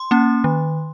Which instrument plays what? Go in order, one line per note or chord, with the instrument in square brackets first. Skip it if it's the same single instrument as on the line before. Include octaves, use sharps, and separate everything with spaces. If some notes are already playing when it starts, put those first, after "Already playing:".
Already playing: [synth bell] C6
A#3 C#4
D#3